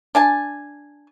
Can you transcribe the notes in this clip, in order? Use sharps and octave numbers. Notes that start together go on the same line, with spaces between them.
D4 G#5 A5